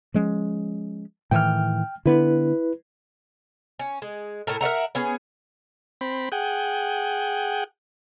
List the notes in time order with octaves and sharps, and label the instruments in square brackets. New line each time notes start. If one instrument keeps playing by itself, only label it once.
[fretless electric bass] F3 G#3 C#4
[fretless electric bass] A2 D#3 E3 [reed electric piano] G5 F6
[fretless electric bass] D3 B3 [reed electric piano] E4 B4
[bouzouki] C#4
G#3
A2 A4 A#4
A#4 E5 F#5 A#5
B3 C#4 G#4
[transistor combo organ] C4 B5
G#4 F#5 G5